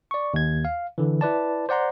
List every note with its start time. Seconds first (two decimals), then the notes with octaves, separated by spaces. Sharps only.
0.11 D5 C#6
0.34 D#2 G#6
0.65 F5
0.98 D3 E3
1.21 E4 B4 D5 A5
1.69 C5 D5 F#5 A#5 C6